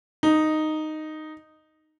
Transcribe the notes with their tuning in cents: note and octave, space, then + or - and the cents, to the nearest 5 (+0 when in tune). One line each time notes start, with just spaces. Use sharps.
D#4 -5